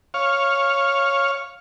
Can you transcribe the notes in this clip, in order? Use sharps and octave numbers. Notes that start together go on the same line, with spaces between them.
C#5 F5